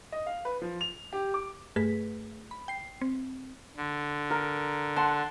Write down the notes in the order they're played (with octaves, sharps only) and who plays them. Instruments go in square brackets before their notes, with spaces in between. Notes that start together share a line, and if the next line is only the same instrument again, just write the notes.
[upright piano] D#5
F5
B4
F3
F7
G4
D6
[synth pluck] G2 A3 G#4 B4 B6
B5
G5 C7
C4
[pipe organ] D3
[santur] A#4
F#5 A5 C6